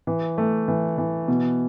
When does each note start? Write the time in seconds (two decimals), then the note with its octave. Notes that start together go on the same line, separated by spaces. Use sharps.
0.07 E3
0.38 A3
0.68 E3
0.98 E3
1.28 B2